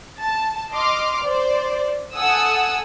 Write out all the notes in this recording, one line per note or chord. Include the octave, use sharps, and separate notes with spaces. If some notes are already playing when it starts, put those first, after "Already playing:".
A5
D#5 C6 D6 F6
C5 D5
A4 F#5 G#5 D#6 E6